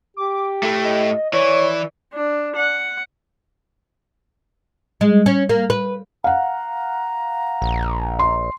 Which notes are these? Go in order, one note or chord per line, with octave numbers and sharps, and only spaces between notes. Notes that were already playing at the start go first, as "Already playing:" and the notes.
G4 D6
A2 A3 A4
D#5
E3 C#5 D5
D4
F#5
G#3
C#4
A#3
B4
F5 F#5 A#5
A#1
C6